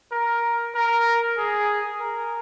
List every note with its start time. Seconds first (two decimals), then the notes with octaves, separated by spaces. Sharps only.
0.12 A#4
0.75 A#4
1.37 G#4
2.00 A#4